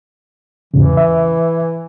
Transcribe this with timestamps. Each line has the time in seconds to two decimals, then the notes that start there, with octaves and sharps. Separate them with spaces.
0.74 E2 G#2 C#3 E3
0.97 E5